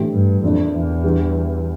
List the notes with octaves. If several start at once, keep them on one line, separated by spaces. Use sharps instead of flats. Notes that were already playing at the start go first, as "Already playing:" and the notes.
Already playing: A2 E3 G3 D4 G4
G2
F2 E3 A#3 D4 F4
E2
E3 G3 D4